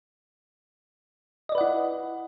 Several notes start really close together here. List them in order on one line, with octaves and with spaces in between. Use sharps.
D#5 D5 B4 F#5 E4